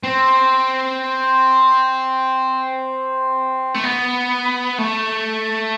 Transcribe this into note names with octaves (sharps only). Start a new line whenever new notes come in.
C4
A3
B3
A3